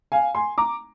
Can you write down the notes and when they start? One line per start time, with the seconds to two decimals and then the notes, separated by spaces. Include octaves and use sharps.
0.12 F5 G#5
0.35 G#5 C6
0.58 A#5 D6